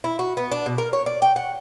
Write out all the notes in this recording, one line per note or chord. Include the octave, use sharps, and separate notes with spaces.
E4
F#4
B3
D4
B2
A#4
C#5
D5
G5
F#5